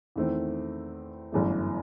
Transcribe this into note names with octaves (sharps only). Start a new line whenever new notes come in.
E2 D#3 A3 C4
G1 F#2 E3 A3